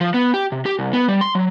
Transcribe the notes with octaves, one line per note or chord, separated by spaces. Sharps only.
F3
B3
G4
C3
G4
C2
B3
G3
C6
F#3